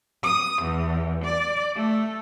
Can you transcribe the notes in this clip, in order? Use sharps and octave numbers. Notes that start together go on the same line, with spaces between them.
D#6
E2
D5
A3